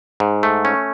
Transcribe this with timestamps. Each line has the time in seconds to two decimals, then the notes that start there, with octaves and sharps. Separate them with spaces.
0.20 G#2
0.43 A3
0.65 C#4